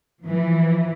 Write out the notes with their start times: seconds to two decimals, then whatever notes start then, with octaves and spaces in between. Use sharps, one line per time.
0.23 E3 F3